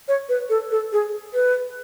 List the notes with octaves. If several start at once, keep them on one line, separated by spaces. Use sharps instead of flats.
C#5
B4
A4
A4
G#4
B4